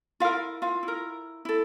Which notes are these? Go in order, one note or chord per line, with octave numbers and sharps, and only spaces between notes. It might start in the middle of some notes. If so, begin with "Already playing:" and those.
E4 F4 A#4 F5
F4 F5
E4
A#4
E4 A4